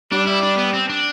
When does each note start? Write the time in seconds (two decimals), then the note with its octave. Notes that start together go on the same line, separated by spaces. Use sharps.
0.12 G3 D4
0.27 E4
0.43 D4
0.58 B3
0.74 C4
0.89 D4